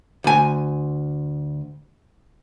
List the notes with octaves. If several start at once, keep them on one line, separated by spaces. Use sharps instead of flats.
D2 G#5